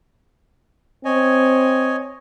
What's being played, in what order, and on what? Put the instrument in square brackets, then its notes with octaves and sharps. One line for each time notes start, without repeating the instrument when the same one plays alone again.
[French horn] C4 [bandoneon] C#5 D#5 G#5